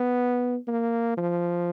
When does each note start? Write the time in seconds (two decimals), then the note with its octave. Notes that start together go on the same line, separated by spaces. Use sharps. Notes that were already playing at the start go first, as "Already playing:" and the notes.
Already playing: B3
0.67 A#3
1.17 F3